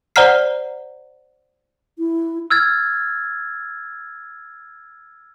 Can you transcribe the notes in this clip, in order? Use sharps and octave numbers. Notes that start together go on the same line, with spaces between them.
C5 D5 F#5 A#5 F6 C7
E4
E6 F6 G#6 A6